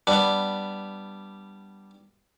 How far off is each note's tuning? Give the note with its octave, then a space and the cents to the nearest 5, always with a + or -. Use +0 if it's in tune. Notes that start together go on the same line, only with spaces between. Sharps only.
G3 +0 B3 +0 D4 +0